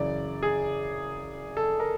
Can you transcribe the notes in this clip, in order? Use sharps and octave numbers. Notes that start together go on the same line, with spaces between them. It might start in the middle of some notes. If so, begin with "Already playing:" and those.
Already playing: F#2 C#3 E3 D5
G#4
A4
A#4